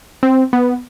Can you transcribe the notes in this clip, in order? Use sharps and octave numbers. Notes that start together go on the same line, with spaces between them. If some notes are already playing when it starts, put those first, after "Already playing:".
C4
B3